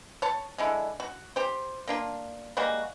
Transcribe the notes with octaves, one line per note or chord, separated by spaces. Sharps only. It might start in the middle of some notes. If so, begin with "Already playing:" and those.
C#5 A5
D3 G#3 E4
F#4
G4 C5
A#3 D4 F4
G3 G#3 A#3 F#4